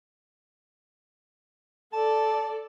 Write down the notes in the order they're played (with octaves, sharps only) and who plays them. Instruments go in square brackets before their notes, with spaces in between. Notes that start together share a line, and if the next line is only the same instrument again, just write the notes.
[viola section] A4 D5 [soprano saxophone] A5